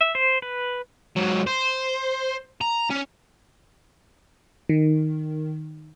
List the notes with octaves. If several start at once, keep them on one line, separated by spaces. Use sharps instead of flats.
E5
C5
B4
G#2 F#3
C5
A#5
C#4
D#3